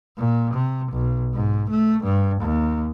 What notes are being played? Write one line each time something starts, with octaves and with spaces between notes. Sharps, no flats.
A#2
C3
B1
G#2
A3
G2
D#2